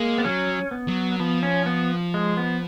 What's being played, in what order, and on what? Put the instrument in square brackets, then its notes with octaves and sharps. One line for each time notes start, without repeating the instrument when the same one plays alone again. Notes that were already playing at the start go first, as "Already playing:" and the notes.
Already playing: [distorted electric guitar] G#3 [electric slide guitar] A#3
[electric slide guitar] B3
[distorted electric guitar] F#3 [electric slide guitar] C#4
[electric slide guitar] B3
[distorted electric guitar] F#3
[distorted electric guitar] F3 [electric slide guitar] B3
[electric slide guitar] C#4
B3
G#3
B3